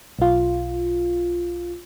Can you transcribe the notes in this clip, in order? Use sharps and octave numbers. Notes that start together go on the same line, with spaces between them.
B1 F4